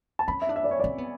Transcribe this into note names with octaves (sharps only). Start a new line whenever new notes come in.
A5
C#4 B5
E5
D4
E5
D5
C#5
C#4 D5
B3